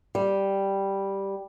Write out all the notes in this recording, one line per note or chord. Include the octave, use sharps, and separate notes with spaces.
G3